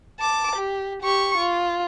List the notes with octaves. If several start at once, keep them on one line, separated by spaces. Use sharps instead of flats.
A5 D6
G4
G4 C#6
F4